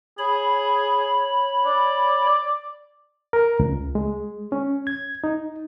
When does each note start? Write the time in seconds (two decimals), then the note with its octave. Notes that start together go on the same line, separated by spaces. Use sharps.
0.19 G#4 C#5 B5
1.65 D5
3.33 A#4
3.60 C#2
3.95 G#3
4.52 C#4
4.87 G#6
5.24 D#4